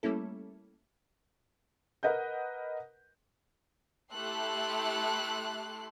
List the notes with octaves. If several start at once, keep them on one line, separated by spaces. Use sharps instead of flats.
G3 A3 A#3 C#4 E4 A4
A#4 B4 D#5 F#5 G6
A3 E4 G4 A4 C6 F#6